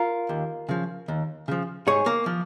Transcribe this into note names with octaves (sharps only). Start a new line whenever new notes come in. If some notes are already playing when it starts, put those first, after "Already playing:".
Already playing: F4 A#4
D#2
C#3 F3
D#2
C#3 F3
G#2 G#4 C#5
A#3
F3